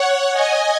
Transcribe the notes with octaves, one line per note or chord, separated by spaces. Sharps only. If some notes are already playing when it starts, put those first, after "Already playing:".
Already playing: C#5 F#5
D#5 G#5